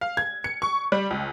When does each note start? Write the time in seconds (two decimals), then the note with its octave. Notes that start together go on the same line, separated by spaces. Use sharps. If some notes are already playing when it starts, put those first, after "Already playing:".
0.01 F5
0.17 G#6
0.44 C#7
0.62 C#6
0.92 G3
1.11 C#2